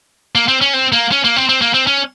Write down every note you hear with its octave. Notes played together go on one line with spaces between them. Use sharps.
A#3
C4
C#4
C4
A#3
C#4
A#3
C4
C4
A#3
C4
C#4